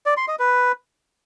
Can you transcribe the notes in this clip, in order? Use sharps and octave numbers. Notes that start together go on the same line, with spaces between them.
D5
C6
D#5
B4